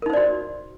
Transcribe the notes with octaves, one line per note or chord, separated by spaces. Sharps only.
D#4 F#4 A#4 C5 D5